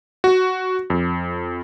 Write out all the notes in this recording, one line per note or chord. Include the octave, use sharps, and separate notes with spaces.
F#4
F2